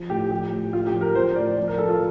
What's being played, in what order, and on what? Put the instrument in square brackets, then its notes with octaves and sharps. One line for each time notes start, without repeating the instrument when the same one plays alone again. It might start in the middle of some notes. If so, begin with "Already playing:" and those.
Already playing: [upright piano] F3
A2 G4
F3 G4
A2
A2 F4
G4
F3
A#4
F3 C5
A2 D5
F3 D5
A#4
F3 A4
F4